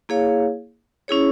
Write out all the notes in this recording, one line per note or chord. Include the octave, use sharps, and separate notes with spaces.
A#3 E4 G#4 C#5 F5
C#4 E4 G#4 C#5